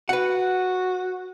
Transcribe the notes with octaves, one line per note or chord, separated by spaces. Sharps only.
F#4 B4 F#5